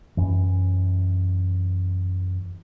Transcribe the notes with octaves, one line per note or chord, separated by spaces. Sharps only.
F#2 E3